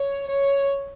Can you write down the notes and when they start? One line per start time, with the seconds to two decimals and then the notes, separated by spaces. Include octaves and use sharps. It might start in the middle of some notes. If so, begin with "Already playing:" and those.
Already playing: C#5
0.30 C#5